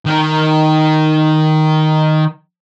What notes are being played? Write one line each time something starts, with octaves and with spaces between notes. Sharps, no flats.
D#3 A#4